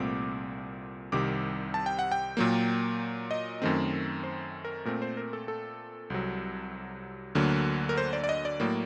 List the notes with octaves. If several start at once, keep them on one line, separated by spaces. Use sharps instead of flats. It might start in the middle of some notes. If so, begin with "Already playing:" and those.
Already playing: C2 A#2 A3 C4 D6
C2 C3 D#3 G3 C4 D6
A5
G5
F#5
G5
A#2 F#3 A#3
D#5
F#2 D#3 A3 C4
C5
A#4
A#2 A3 C4 A#4
C5
A#4
A4
A4
C2 C3 F#3
D2 D3 F#3 A#3
A#4
C5
D5
D5
D#5
D5
A2 F#3 A#3